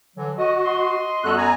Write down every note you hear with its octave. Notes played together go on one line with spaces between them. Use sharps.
D3 E3 F#3
F#4 D#5
D#5 C6
F#2 G3 B3 F#4 A4 F#6
G#5 A#5